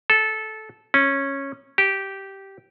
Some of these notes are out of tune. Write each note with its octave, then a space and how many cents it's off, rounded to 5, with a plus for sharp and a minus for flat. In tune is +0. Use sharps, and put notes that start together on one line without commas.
A4 -15
C#4 -10
G4 -10